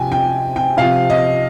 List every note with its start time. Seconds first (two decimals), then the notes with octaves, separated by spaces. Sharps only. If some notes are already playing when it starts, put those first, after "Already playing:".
Already playing: C3 F3 G5 G#5
0.12 G5
0.56 G5
0.77 C3 F3 F5
1.10 D#5